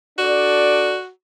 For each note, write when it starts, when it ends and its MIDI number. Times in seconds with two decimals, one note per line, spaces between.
0.18 0.97 62
0.18 1.09 66
0.18 0.97 69
0.18 0.97 74